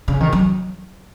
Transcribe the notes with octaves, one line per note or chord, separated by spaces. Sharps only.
C#3
D#3
F#3